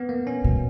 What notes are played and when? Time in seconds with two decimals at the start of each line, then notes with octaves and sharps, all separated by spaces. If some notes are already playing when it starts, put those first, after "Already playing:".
Already playing: B3
0.09 A#3
0.27 C#4
0.44 B2